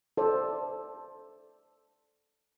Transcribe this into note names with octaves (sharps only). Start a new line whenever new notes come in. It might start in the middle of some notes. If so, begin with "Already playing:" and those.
A4 C5 D5